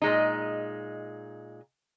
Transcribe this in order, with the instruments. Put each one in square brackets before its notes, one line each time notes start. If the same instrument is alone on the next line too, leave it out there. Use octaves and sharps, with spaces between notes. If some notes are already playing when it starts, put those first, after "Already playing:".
[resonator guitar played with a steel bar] A#2 G#3 D#4